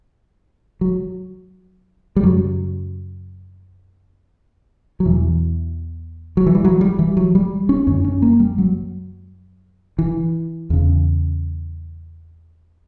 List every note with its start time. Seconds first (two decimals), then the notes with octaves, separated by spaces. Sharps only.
0.81 F#3
2.16 G3
2.23 F#2 C#3 F#3
5.00 F#3
5.05 E2 B2 E3
6.37 F#3
6.46 E3
6.55 G3
6.64 F#3
6.81 G3
6.99 E3
7.17 F#3
7.35 G3
7.69 C#4
7.87 F#2 D3 C#4
8.04 C#4
8.22 A#3
8.40 G3
8.58 F#3
9.99 E3
10.70 E2 C#3